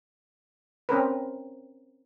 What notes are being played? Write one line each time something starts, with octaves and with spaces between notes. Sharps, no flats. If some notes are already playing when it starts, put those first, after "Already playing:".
C4 C#4 A#4 B4